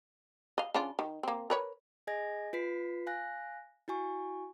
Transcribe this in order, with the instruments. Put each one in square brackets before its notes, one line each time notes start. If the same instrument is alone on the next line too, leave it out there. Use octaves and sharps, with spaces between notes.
[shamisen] D#5 F5
C#3 D4 F4
D#3
A#3 C4
A#4 B4 C#5
[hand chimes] G#4 D#5 G#5 G#6 A#6
F4 B4 B6 C7
F5 G#5 F#6 A#6
E4 F#4 G#5 C#6